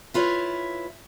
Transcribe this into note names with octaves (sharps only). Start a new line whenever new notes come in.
E4 F4 B4 C#5